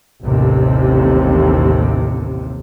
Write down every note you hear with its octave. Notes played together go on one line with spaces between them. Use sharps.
A1 D#2 C3